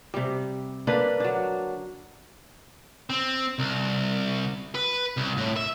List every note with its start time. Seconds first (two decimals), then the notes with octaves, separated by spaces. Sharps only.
0.14 C3 G3
0.87 D3 A#3 D4 B4
1.20 F#3 D4
3.10 C4
3.59 C2
4.75 B4
5.17 C2
5.37 A2
5.56 E5